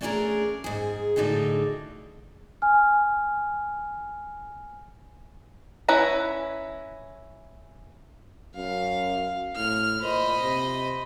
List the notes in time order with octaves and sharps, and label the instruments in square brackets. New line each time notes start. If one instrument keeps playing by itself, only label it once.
[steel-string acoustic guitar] A3 C#4 D4 F#4 G#4 A#4
G#2 G#4
A2 D3 D#4 F#4 G#4
[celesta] G#5 F6
[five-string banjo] C#4 E4 B4 A#5
[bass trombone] F#2 [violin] F5
[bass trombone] A2 [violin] F6
[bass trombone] A#2 [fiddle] C5 D#5 [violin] B5
[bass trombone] C3